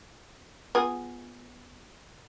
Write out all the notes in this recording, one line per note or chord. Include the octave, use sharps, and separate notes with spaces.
B3 F4 G#4